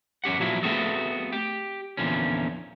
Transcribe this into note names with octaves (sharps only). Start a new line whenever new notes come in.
F#2 C#4 G4 F#5
A#2 F3 F#3 E4
A3 B3 C4 F#4 G#4 A4
G4
E2 A#2 D3 F3 C#4